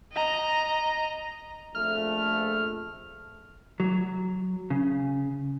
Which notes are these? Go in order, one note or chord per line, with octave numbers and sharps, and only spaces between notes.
D#5 A#5
A#1 F2 A3 F6
F#3
C#3